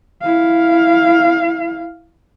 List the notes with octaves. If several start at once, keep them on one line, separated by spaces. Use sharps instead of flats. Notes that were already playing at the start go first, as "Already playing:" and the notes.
E4 F5